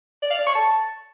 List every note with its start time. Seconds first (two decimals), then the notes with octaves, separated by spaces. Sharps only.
0.22 D5
0.30 F5
0.39 D5
0.47 C#6
0.55 A5